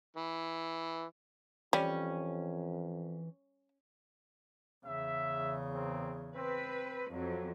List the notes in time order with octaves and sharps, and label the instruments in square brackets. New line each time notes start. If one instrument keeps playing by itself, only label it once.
[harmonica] E3
[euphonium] F2 [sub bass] E3 [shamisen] G3 [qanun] C#4
[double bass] E2 C#3 [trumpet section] E5
[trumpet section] C4 A#4
[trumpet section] C4 [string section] B4
[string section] F2 [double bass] F#3